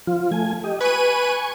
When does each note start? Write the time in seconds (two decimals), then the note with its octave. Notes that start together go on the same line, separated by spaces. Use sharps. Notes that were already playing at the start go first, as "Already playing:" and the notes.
0.07 F3 F4
0.32 A3 G#5
0.64 G4 D#5
0.81 B4 G#5 C#6 D#7